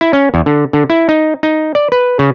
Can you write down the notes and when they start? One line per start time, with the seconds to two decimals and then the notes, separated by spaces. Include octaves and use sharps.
0.01 E4
0.13 C#4
0.34 E2
0.46 D3
0.73 D3
0.90 E4
1.09 D#4
1.43 D#4
1.75 D5
1.92 B4
2.19 C#3